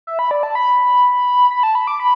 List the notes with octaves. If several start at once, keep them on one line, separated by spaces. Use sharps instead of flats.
E5
B5
D5
A5
B5
B5
A5
B5
D6
B5